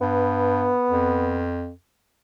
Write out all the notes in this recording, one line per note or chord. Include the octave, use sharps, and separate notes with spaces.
G2 B3
F2